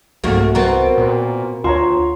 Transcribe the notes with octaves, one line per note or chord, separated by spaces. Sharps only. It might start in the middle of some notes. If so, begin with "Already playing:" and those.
C2 G#2 A3 A#3 F#4
B2 B3 C4 A#4 A#5
A#2
D2 F4 C#5 A#5 C6